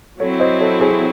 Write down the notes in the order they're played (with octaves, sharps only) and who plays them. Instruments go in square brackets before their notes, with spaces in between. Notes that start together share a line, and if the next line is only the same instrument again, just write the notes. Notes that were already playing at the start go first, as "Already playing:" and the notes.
[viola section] F#3 C4 E4 [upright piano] A4 C#5
[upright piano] C5 D#5
A4 C#5
G#4 C5